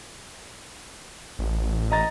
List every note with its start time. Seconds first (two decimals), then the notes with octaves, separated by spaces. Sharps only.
1.39 A1
1.91 D#5 A#5 A6